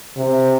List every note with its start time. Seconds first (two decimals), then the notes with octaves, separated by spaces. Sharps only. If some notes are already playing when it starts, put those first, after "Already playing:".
0.17 C3